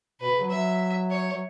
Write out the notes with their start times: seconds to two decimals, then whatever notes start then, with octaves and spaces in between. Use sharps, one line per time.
0.20 B2 B4
0.31 C#3
0.40 F#3
0.50 F#3 E5
1.10 C#5
1.32 F#3